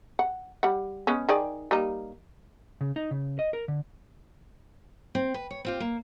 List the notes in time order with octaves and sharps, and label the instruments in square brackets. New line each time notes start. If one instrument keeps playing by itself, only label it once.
[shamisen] F#5
G3 F#5
G#3 B3 C#4
D#3 G#4 D5
G3 A#3 D#4
[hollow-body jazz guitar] C#3
D#4
C#3
D#5
A#4
D3
[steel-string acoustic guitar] C4
B4
C#5
C4 F4 G4
A#3